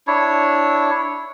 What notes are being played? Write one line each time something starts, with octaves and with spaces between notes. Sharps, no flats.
D4 E4 C#5